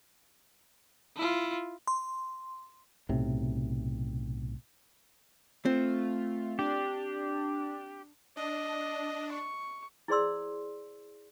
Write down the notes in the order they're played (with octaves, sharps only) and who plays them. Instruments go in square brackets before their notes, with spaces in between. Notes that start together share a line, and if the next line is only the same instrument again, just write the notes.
[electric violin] E4 F4
[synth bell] C6
[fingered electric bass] B1 A2 C3
[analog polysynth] A3 F4 [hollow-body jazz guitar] C4
[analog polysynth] D4 [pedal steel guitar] G4
[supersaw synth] D4 [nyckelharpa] D#5
[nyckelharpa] C#6
[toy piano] E4 G#4 C5 D5 C6 E6